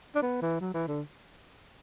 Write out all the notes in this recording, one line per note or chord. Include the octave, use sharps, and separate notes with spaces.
D4
B3
E3
F#3
E3
D3